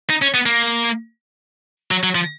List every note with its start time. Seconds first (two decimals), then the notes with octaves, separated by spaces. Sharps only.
0.10 D#4
0.22 C#4
0.34 B3
0.46 A#3
1.91 F#3
2.03 F#3
2.15 F3